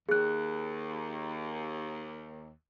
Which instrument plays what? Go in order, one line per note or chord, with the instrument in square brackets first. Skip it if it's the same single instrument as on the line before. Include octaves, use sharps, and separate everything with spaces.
[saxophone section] D#2 [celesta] G#4 F#6